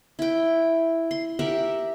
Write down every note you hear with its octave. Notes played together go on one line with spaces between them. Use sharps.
E4 G5
C6
G4 A#4 E5 F#5